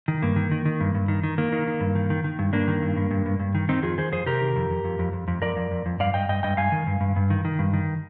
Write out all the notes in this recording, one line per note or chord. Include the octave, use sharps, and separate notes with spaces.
D#3
G2 A#3
D#3
D#3
D#3
G2
G2
D#3
D#3
D#3 A#3
D#3
D#3
G2
D#3
D#3
D#3
G2
G2 A#3 D4
D#3
G2
G2
G2
G2
G2
D#3
D#3 C4 D#4
F2 F4 G#4
D#3 G#4 C5
F2 G#4 C5
C3 G4 A#4
D#3
F2
F2
F2
F2
F2
F2
F2 A#4 D5
F2
F2
F2
G2 D5 F5
G2 D#5 G5
G2 D#5 G5
G2 D#5 G5
G2 F5 G#5
D#3
G2
G2
G2
D#3
D#3
G2
D#3